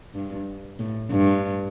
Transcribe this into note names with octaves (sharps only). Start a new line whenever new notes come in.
G2
A2
G2